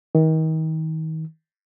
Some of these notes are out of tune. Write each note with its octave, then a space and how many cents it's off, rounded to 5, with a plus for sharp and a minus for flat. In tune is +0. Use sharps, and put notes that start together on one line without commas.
D#3 +35